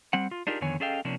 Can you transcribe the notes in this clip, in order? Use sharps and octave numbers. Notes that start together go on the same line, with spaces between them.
G3 C4 F#5
F4
D4 D#4 F4 G4 G#4 A#4
F2 D3 D#3 B3 C#5 G#5
C#4 G#4 A4 D#5 F5 G5
C3 F3 A#3 C#4 D4